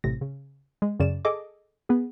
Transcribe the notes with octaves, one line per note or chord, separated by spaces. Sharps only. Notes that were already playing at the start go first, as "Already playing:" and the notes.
A1 A2 C3 A#6
C#3
G#3
F#2 C#3 D5 E7
G#4 A4 D#5 D6
B3 G#4